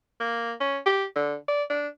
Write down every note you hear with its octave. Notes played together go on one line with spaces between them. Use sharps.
A#3
C#4
G4
D3
D5
D4